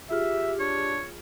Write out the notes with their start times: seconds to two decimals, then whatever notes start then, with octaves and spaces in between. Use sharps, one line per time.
0.11 F4 G4 G#4 E5 F6
0.60 D4 C#5